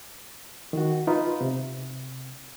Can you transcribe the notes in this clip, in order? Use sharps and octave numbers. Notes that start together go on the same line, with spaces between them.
D#3 F#4
D#4 F4 B4
C3